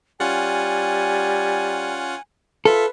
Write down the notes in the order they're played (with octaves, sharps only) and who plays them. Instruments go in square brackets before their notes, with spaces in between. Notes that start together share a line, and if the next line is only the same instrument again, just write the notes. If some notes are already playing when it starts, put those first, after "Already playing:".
[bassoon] G3 [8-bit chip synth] C#4 F4 F#5 [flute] G#5
[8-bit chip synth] F4 E5 [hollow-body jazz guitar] A4 [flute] B4